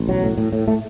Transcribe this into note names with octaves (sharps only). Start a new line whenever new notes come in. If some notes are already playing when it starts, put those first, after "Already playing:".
Already playing: A1
B1 F#3
A2
A2
A2
A2 A3